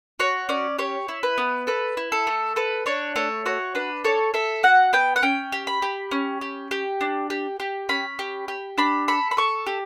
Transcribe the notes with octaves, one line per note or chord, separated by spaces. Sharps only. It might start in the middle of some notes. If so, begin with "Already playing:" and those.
F#4 C#5
C#4 D5
G4 C#5
E4
B4
B3
A4 B4
E4
A4
A3
A4 B4
D4 C#5
A3 C#5
F#4 C#5
D4 B4
A4 C#5
A4 E5
F#4 F#5
B3 G5
F#5
C#4 G5
G4
B5
G4
C#4
G4
G4
D4
G4
G4
C#4 B5
G4
G4
D4 B5
A4 B5
B5
A4 C#6
G4